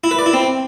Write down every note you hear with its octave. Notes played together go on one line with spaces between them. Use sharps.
E4
B4
D5
E4
C4